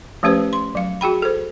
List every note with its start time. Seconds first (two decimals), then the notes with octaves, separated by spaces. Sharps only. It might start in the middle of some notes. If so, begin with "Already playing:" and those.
0.23 F3 A3 C#4 G4 B4 C5
0.53 C6
0.75 F#3 F5
1.01 F#4 G#4 G5 B5
1.22 A4 C5